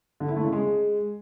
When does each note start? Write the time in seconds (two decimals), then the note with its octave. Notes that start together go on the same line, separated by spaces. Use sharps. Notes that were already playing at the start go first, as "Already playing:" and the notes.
0.20 D3
0.28 E4
0.36 A3
0.44 C#3
0.52 G#3